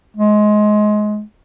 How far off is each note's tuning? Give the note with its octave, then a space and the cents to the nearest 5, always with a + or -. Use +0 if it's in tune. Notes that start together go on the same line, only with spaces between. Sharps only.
G#3 +20